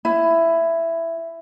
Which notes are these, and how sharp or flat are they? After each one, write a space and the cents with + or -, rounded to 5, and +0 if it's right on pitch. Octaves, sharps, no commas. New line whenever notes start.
E4 +10